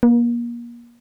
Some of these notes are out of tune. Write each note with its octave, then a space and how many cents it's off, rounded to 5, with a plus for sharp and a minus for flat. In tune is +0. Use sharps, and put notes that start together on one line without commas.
A#3 +30